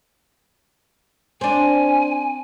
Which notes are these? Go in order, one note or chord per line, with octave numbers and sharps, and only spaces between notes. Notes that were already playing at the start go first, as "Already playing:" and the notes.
C4 D4 G#5